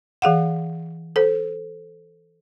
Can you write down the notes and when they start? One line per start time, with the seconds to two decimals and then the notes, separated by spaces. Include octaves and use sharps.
0.22 E3 G#4 F5 F#5
1.16 A4 C5